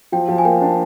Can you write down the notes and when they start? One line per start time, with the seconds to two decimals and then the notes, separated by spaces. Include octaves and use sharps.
0.12 F3 G5
0.28 F3
0.38 G#5
0.45 A#3 G5
0.61 D4